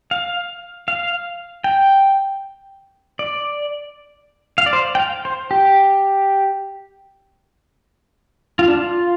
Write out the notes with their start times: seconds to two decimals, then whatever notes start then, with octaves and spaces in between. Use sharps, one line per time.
0.11 F5
0.88 F5
1.64 G5
3.19 D5
4.58 F5
4.66 D5
4.73 C5
4.95 G5
4.99 F5
5.25 C5
5.51 G4
8.59 F4
8.68 D4
8.77 F4